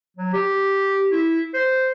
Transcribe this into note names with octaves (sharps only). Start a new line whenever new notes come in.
F#3
G4
E4
C5